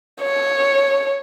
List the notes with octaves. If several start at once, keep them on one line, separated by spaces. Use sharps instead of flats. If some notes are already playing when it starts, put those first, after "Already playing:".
C#5